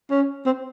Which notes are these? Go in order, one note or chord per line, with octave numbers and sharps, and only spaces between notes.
C#4
C4